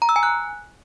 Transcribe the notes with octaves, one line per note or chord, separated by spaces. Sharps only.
A#5
E6
G#5
F#6